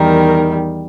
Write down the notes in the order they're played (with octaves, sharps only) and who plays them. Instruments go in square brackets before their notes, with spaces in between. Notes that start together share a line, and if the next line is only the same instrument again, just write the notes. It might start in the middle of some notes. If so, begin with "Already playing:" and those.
Already playing: [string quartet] E2 D#3 G3 A#4